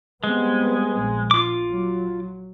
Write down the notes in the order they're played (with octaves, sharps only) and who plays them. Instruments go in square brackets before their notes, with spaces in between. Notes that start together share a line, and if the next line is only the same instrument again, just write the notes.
[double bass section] G3 B3 C4 [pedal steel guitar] G#3
[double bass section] A#1
[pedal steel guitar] F4 D6
[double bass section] F#3